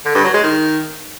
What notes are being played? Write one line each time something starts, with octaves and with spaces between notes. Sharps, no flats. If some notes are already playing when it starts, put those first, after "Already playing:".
D3
G2
F#3
G#3
D#3